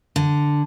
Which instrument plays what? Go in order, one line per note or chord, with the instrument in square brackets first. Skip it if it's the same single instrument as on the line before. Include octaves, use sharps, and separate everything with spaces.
[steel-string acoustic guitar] D3